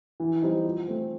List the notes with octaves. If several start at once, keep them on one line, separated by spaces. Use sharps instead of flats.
E3
G3 C4 D#4
F3
A3 C4